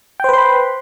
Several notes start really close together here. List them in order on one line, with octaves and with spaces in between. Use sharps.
G5 C5 B4 C6 B5